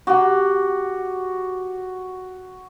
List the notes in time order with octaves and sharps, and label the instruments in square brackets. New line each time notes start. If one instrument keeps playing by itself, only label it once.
[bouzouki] C3 G4 [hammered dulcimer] F#4 D6